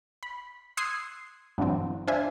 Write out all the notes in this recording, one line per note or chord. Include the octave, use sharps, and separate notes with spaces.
B5
C6 D#6 E6 F#6 G#6 C7
G2 B2 D3 E3 F#3 C4
D4 F4 C5 E5 G#5